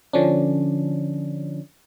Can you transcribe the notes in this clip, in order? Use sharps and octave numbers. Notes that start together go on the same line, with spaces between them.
D3 F3 C#4 D4